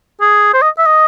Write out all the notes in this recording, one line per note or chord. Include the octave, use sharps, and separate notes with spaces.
G#4
C5
D#5
E5
D#5